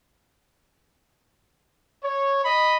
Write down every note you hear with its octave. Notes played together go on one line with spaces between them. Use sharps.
C#5
D#5 B5